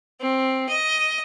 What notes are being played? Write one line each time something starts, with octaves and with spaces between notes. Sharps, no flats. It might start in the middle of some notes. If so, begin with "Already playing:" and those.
C4
D#5